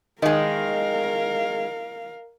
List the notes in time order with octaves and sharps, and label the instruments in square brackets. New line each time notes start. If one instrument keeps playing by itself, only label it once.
[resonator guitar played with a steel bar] D#3 G#3 [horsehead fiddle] A#4 F5 [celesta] D#5